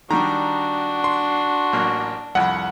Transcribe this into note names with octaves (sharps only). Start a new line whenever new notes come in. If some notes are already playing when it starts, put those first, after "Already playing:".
D#3 G3 D4 F#4 A#5
C6
A1 F#3 A#3
C2 F2 F#5 B5